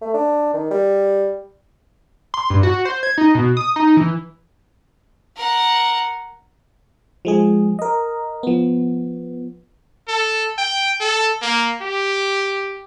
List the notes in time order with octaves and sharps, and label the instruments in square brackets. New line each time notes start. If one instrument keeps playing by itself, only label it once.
[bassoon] A3
D4
D#3
G3
[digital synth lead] C6
G2
F#4
C5
G#6
D#4
B2
D#6
D#4
E3
[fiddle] A#4 F#5
[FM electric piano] F3 G#3 G#4
A#4 D#5
F3 B3
[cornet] A4
G5
A4
A#3
G4